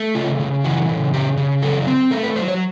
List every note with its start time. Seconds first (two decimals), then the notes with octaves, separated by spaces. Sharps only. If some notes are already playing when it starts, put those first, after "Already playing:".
Already playing: A3
0.15 C#3 F4
0.40 C#3
0.64 E3 F#4
0.89 C#3
1.13 C#3 G4
1.37 C#3
1.62 F#3 A4
1.87 C4
2.11 A3 A#4
2.23 B4
2.36 F#3 C5
2.48 C#5